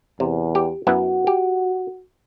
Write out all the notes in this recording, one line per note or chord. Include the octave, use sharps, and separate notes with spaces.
E2 C3
G4
F#2 B3 E4 F#4
G4